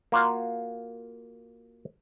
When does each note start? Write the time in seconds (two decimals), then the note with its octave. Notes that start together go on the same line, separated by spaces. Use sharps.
0.12 A#3 F4 F#4 F5